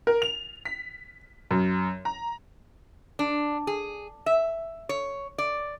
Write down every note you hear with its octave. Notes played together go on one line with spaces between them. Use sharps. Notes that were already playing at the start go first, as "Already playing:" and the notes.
A#4
F7
B6
F#2
A#5
D4
G#4
E5
C#5
D5